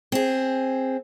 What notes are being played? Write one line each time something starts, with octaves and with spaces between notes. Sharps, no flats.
C4 G#4